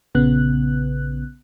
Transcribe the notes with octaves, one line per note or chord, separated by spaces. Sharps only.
A#1 C#3 B3 F#6